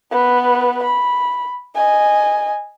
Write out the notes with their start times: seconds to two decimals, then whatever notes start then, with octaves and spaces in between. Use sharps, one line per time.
0.11 B3 B4
0.83 B5
1.76 D#5 G#5